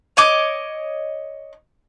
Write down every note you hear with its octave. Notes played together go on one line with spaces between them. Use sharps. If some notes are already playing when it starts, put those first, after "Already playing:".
C#5 D#5 D6